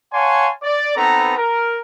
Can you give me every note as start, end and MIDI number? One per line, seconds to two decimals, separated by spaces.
0.13 0.49 73
0.13 0.49 77
0.13 0.49 78
0.13 0.49 80
0.13 0.49 81
0.13 0.49 84
0.63 0.93 74
0.97 1.33 59
0.97 1.33 60
0.97 1.33 63
0.97 1.33 69
0.97 1.33 71
0.97 1.33 82
1.38 1.80 70